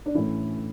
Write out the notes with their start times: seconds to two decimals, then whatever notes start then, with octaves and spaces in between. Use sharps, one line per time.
0.06 D4
0.14 A2 E3 C#4 E4